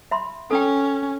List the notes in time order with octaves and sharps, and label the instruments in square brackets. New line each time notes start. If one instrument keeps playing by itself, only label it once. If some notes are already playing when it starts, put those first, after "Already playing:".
[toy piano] E5 B5 C6
[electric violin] C#4 [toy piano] A4 G5